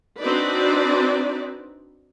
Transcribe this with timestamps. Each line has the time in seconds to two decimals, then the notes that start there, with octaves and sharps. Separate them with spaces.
0.21 C4 D4 D#4 F#4 B4 D5